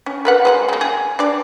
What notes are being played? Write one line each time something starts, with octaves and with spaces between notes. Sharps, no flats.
C#4
A#4 B4 F#5
G#3 B4 F#5
C#3 A#3
G#4
D4 D5